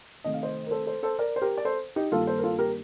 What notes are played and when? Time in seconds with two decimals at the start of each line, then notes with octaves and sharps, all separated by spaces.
0.24 C3 D#3 A3 D#5
0.34 F5
0.42 C5 D#5
0.67 A#4
0.71 A4 C5
0.87 A4 C5
1.03 A4 C5
1.19 A#4 D5
1.36 C5
1.42 G4 A#4
1.57 D5
1.65 A4 C5
1.96 D#4 G4
2.12 G2 D#3 A#3 F4 A4
2.27 A4 C5
2.39 A#4
2.43 F4 A4
2.58 G4 A#4